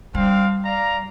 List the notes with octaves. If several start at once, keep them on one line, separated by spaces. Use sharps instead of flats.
G3 C4 D4 F5
D5 F5 A#5